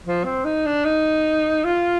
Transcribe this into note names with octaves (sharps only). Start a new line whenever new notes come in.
F3
C4
D#4
D4
D#4
F4